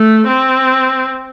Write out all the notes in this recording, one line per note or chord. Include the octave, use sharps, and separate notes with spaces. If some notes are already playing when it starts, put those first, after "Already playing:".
Already playing: A3
C4